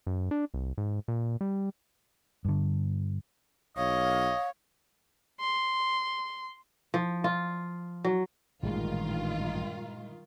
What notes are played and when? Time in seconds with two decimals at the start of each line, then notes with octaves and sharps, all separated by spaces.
0.07 F#2
0.31 D4
0.54 C2
0.78 G#2
1.08 A#2
1.41 G3
2.45 G2 D3
3.77 B1 C#5 D#5 F5
5.40 C6
6.94 F3
7.24 F4
8.05 F#3
8.63 A1 G2 A#2 D#3 G#3 F4